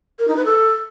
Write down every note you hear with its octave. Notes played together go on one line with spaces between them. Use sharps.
A#4
D#4
B4
A4